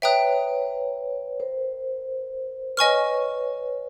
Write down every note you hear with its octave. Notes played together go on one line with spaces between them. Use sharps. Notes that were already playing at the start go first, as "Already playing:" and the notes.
B4 C#5 E5 G5 A#5 D#6 F#6
A#4 C5
B4 C#5 D#5 G#5 C#6 F6